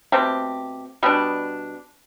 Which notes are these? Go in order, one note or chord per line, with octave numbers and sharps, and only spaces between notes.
B2 A3 C4 G4
B2 G3 B3 D4